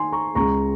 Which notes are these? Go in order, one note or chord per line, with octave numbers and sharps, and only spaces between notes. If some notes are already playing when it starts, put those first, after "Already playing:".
Already playing: D#3 G#5 C6
A#5 C#6
C#2 C#3 A#5 C#6